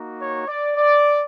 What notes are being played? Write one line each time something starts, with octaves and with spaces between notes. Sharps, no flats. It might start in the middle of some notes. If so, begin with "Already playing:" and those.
Already playing: A#3 D#4 F#4
C#5
D5
D5